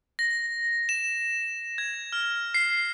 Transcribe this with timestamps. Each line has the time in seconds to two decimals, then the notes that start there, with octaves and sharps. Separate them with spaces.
0.19 A#6
0.89 E7
1.78 G#6
2.13 F6
2.54 C7